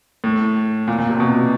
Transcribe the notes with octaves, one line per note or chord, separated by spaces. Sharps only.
A2
A#2
A#2
C3
B2